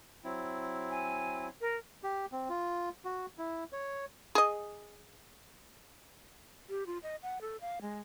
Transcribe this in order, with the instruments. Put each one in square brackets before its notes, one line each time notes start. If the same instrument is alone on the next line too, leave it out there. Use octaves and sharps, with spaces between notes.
[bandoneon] F#3 C4 E4
[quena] G#5
A#4
[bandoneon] G4
C4
F4
F#4
E4
C#5
[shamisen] G#4 D#5
[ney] G4
F4
D#5
F#5
A4
F5
G#3